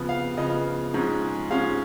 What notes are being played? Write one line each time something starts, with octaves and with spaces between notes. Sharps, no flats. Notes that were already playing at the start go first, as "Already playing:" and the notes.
Already playing: C#3 F3 B3
F5
C#3 F3 B3 D#5
G#2 F3 G#3 C#4
G#2 F3 G#3 C#4 F5